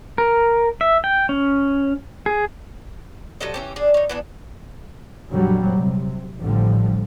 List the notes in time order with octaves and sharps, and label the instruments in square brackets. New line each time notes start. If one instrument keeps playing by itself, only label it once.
[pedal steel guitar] A#4
E5
G5
C#4
G#4
[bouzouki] C3 F#3 A4 D#5
E3 C#4 G4
D4 G#4
D#4 C#5
E3 B3 D4
[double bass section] F2 A#2 D3 F#3 G3
C3
A1 A2 D3 F3 G3